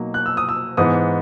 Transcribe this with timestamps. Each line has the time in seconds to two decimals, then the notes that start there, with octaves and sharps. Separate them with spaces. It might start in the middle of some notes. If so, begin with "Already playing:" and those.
Already playing: B2 F#3 A#3 D#4
0.14 F#6
0.26 E6
0.37 D#6
0.49 E6
0.77 G#2 E3 B3 D#6